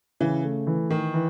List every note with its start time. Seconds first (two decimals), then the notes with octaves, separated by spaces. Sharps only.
0.20 C#3 E3
0.44 A3
0.67 E3
0.90 D#3 E3
1.14 E3